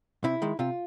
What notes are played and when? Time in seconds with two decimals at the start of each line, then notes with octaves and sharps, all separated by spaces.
0.24 C3 E4
0.42 D#3 G#3
0.59 C3 F4